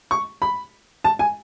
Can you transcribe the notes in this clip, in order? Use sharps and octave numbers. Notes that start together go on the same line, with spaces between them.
C#6
B5
A5
G#5